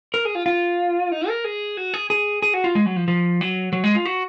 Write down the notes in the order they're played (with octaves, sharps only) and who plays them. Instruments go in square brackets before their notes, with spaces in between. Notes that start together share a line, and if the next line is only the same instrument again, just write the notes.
[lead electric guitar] A#4
G#4
F4
F4
D#4
A#4
G#4
F#4
G#4
G#4
G#4
F#4
F4
G#3
F#3
F3
F3
F#3
F#3
G#3
F4
F#4